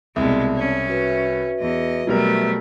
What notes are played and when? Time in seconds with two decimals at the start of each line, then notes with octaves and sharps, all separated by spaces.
0.16 C2 B2 G#3 C4 D5 A5
0.56 C#4
0.88 F#4 B4 E5
1.60 E2 D#5
2.07 B2 F#3 G3 A3 A#4